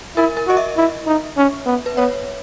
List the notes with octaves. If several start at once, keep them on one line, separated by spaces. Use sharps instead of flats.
E4 A#4
A#4
F#4 D#5
E5
E4
D#4
C#4
B3
B4
B3 C#5